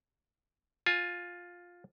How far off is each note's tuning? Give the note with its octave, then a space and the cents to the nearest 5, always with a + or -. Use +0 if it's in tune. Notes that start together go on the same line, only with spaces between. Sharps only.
F4 +10 G#5 +10